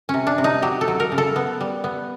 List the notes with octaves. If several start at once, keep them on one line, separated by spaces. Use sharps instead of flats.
C3 C#4
D4
C3
D#4
F#3 G4
A4
F#3
A#4
C#3
A4
B3
G3
B3